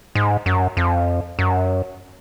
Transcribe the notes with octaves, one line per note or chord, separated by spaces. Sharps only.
G#2
F#2
F2
F#2